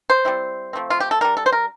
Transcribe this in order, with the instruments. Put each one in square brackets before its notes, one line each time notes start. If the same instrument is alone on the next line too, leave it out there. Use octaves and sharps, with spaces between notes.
[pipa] C5
G3 C4 E4
F3 A3 C4
F4
G4
A4
G3 D4 A#4
A4
C5
A#4